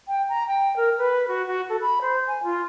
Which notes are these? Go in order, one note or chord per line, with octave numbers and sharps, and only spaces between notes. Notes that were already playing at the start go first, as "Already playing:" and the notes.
G5
A#5
G5
A#4
B4
F#4
F#4
A4
B5
C5
G#5
F4